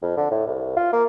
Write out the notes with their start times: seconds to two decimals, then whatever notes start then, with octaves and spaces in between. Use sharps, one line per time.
0.02 F2
0.17 D3
0.31 A2
0.47 C2
0.77 F4
0.93 A#3